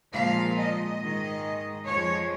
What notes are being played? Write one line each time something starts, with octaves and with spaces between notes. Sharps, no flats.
A#2 F3 G#3 F5
D#5
G#2 D#3 G#3
F2 F3 G#3 C#5